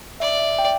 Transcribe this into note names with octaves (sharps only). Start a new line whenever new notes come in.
D5 E5
E5
G5